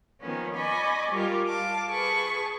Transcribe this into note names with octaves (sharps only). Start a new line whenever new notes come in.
D#3 F3 A#3 B3 C#4
D5 D#5 G#5 B5 C#6
G3 F4 A#4
F5 A5 D6
G#4 B4 A5 C#6